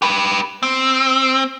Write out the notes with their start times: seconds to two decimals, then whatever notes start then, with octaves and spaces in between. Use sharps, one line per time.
0.02 G4 B4
0.63 C4